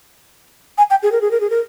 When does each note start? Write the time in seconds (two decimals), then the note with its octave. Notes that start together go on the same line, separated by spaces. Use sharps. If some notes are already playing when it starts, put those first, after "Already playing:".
0.78 G#5
0.90 G5
1.03 G#4
1.12 A#4
1.21 G#4
1.31 A#4
1.40 G#4
1.50 A#4